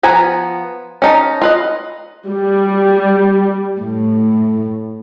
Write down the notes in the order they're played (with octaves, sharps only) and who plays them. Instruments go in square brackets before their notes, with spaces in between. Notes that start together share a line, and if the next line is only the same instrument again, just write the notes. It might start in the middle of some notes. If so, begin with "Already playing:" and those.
[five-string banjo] F3 B3 G#5 A#5
C#4 D#4 A5
F4 B4 D#5
[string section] G3
A2